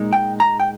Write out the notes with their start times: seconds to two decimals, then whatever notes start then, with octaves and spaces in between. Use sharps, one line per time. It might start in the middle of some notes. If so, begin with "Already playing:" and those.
Already playing: A#2 G#3 D#4
0.13 G5
0.40 A#5
0.60 G5